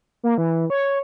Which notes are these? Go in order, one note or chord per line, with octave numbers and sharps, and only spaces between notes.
A#3
E3
C#5